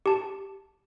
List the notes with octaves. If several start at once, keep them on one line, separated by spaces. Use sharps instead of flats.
G4 A5